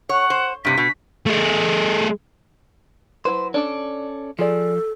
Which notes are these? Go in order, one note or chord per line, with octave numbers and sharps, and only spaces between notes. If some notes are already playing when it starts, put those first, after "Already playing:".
C#5 F#5
C5
G2 C3 B6
B2
A3 G#4
F#3 E4 B4 C5
C#4 D4 A4 D5
F3 F4 G#4 A4 D5